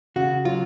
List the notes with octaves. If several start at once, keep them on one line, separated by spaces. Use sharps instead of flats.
C#3 F#4
F#3 F4